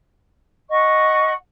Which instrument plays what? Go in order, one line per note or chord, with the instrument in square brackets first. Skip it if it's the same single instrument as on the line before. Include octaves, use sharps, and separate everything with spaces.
[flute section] D#5 F#5 C#6